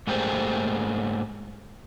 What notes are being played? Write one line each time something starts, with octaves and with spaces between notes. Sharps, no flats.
G#2 A3 A#3 G4 G#4 C5